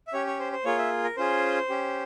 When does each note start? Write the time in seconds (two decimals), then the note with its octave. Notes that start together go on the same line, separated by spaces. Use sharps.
0.07 E5
0.13 C#4 G4 C#5
0.27 C#5
0.40 C5
0.52 C5
0.65 A#3 F4 G#4 C#5
0.78 E5
1.04 A#4
1.17 C#4 F4 G#4 C5
1.70 C#4 G4